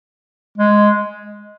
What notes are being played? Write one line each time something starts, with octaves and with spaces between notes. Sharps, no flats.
G#3